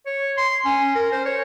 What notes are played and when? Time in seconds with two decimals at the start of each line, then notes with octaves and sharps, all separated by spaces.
0.06 C#5
0.37 C6
0.65 C#4
0.95 A#4
1.12 C5
1.25 C#5